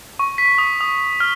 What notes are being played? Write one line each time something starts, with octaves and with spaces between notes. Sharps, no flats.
C#6
B6
D#6
D#6
F6